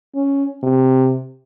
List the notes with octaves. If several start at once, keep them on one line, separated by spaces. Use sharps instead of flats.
C#4
C3